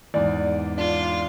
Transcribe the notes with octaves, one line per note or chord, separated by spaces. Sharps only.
E2 G#2 D5
D4 F4